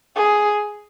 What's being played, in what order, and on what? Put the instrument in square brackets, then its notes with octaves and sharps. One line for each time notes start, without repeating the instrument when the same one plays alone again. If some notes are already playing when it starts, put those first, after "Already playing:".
[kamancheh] G#4